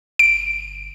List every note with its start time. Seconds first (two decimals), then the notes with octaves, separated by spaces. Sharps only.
0.19 G1 D7